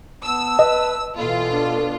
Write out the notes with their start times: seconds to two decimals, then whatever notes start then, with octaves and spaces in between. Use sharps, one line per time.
0.23 B3 A5 E6
0.59 B4 D#5
1.18 B2 E3 F4 A4
1.52 D4